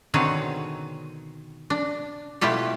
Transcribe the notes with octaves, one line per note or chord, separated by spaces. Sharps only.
B2 D3 D#3 C4 G#4 C#5
D4
B2 A3 E4 F4 G4 A4